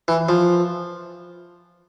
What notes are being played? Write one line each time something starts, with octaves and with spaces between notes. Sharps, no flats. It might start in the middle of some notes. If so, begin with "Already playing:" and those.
E3
F3